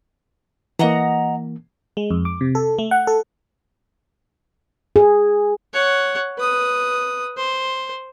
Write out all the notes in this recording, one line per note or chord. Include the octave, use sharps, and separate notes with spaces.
E3 A#3 D#5 F#5 A#5
G#3
F2
D6
C3
A4
A3
F#5
A4
G#4
C#5 F#5
B4 D#6
C5